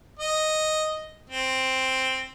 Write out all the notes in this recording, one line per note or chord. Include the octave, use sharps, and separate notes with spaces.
D#5
C4